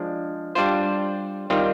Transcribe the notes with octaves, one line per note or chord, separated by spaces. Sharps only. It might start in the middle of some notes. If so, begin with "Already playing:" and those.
Already playing: F3 G#3 D4
G3 D4 F4 C5
D#3 G3 C4 F4